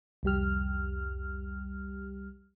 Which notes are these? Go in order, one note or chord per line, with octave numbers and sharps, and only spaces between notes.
C2 F2 G3 G4 F6